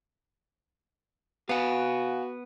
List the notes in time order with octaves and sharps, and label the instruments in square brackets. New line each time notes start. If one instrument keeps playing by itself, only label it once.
[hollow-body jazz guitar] B3 F#5 [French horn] F#4 [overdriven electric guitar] F5 G#5